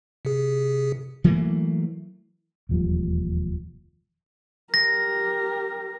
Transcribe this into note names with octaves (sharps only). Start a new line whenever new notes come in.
C3 G#4
E3 F#3 A3 A#3
E1 D#2 F3 G3
G4 A#4 A#6